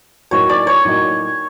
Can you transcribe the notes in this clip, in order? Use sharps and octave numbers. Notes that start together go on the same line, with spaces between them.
A2 F#3 A#3 D#4 F#4 C#5
D5
C#5
A2 F#3 A#3 D#4 F#4